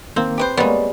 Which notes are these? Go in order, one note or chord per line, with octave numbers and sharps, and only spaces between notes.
D#3 A#3 C4
G4 B4 C5
G3 G#3 A#3 B3 C#5